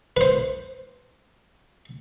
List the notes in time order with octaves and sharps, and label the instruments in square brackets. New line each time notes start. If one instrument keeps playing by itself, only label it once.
[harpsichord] B4 C5